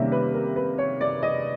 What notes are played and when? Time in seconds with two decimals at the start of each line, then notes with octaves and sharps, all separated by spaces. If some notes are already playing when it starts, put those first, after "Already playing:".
Already playing: C3 D#3 G3 A#3 C#4 E5
0.12 B4
0.34 A#4
0.56 B4
0.78 C#5
1.01 D5
1.23 D#5